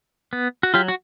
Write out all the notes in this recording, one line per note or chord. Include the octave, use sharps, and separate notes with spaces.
B3
F#4
F#3 F4 G4
F#4